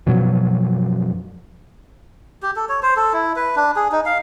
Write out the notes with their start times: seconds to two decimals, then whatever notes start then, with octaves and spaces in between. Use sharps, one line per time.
0.06 F#2 B2 F3 F#3
2.43 G4
2.56 A4
2.69 C#5
2.83 C5
2.96 A4
3.13 E4
3.36 B4
3.56 D4
3.76 G#4
3.92 D#4
4.05 F5